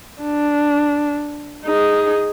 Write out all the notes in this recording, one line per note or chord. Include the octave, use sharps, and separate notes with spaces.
D4
D#4 G#4